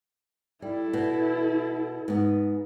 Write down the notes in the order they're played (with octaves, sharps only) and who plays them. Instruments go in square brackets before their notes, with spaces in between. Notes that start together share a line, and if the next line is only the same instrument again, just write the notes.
[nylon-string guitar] G3 [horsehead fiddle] E4 A4
[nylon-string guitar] B2
G#2 B3